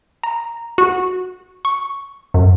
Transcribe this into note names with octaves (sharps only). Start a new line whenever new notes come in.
A#5
F#4
C#6
F#2